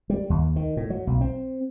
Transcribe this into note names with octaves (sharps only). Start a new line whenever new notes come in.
G3
D#2
D#3
A2
F#3
B1
C4